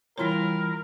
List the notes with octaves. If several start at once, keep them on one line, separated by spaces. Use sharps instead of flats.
E3 G3 E4 F4 A#4 C#5 B5 C6